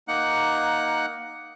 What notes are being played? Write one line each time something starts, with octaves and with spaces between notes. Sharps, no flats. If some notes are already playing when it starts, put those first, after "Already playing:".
A#3 D#4 F#5 F#6